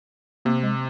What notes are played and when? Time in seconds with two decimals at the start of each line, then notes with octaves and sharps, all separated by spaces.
0.45 C3 A#3
0.63 G#3